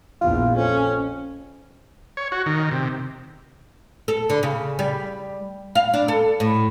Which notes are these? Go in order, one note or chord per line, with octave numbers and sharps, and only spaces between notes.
A#1 E2 F4
F2 C#4
C#5
F#4
D#3
C3
A4
D3
C#3
G3
F5
D4
A4
A2